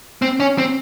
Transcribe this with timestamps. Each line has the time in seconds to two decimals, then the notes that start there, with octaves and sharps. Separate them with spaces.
0.22 C4
0.40 C#4
0.58 C4